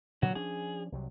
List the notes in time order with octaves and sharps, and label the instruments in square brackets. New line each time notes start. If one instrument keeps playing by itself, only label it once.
[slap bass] A#2 D3 E3 [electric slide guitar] F#3 F#4
[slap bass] F3 C#4 D4 [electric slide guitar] G#4
[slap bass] C2 C3 F#3